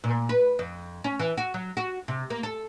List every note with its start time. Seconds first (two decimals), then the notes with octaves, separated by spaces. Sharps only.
0.04 A#2
0.29 B4
0.59 F2
1.04 C#4
1.19 E3
1.37 F#4
1.54 F#3
1.77 F#4
2.08 C3
2.30 A#3
2.43 A4